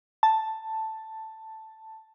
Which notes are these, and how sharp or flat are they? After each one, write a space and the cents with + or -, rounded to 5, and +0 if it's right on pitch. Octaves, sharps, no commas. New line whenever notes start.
A5 +5